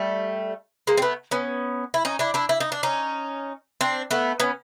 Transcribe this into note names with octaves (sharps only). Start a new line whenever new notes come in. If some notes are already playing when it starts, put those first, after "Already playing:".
Already playing: G3 A3
G#3 A#3
C4
A3 B3
B3 C#4
E4
C#4 D#4
D4 E4
D4 E4
E4
D#4
D4
C#4 D#4
C4 D4
A3 B3
B3 C#4